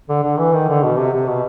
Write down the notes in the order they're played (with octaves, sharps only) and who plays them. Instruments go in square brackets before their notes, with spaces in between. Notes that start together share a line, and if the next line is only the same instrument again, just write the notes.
[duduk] D3
D3
E3
D#3
D3
B2
C3
C3
B2